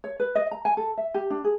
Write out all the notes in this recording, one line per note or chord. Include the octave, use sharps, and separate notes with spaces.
C#5
B4
D#5
A#5
G#5
A4
E5
G4
D4
G#4